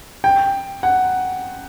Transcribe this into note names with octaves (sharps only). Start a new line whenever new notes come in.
G5
F#5